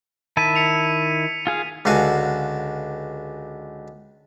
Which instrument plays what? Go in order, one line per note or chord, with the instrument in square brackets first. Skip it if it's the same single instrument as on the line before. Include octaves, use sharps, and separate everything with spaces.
[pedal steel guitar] D#3 E4 A5 [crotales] B6 D#7
[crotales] B6 C#7 F7
[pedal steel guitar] F4 G#4 F5
[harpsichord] C#2 D3 F#4 F5 G#5